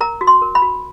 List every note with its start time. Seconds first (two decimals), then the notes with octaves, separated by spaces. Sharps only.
0.01 A#4 A#5
0.21 F#4
0.27 C6
0.42 A#4
0.55 B5
0.62 F#4